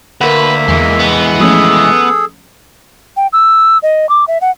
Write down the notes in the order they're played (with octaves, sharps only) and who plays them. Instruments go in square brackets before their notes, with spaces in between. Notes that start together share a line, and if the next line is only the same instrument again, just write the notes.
[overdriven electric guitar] D2 [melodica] A#3 E5 [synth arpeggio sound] A#4 F#5 [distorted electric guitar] B4
[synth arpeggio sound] E2 [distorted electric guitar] E3 G#3
[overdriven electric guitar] B3
[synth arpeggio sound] F3 A3 C#4 [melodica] G#4 A4
[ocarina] G5
E6
D#5
D6
E5
F#5